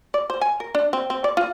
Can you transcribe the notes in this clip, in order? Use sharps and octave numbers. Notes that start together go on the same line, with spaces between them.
D5
C5
G#5
A#4
D4
C4
C4
D5
F4